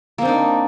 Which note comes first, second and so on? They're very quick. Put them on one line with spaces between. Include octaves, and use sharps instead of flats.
A#3 C4 D4 D#4